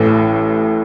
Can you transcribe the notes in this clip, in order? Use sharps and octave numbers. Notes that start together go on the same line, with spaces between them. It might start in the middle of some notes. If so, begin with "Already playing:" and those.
Already playing: A1 A2 E3